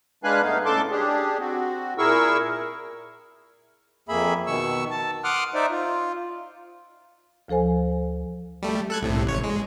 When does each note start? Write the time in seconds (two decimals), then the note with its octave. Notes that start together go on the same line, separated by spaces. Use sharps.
0.24 G#3 D4 B4 F5 G#5 F#6
0.42 G2 A3 B3 D#4 F5
0.65 A2 C#3 A4 A5 C6 D6
0.91 D4 G4 G#4
1.40 C4 F#4
1.98 A#2 E4 G#4 A#4 C#6 E6
4.09 F2 A#3 G#4 E5 B5
4.47 B2 D#3 C#6 E6
4.91 A5
5.24 F#5 C6 D6 D#6 F6 F#6
5.54 D#4 C5 D5 E5
5.71 F4
7.48 D2 F3 A4 C5 G#5
8.62 G3 A3
8.90 A4 F#6 G#6
9.02 C2 A2 C3
9.26 A1 C#5
9.44 G#3